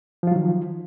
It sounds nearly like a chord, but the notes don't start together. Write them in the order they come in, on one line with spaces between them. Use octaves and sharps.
F3 F4 F#3 D#3